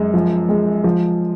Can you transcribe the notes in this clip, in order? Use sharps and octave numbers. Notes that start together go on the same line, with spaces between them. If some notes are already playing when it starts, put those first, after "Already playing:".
Already playing: F#2 G#3
F3
G#3
F3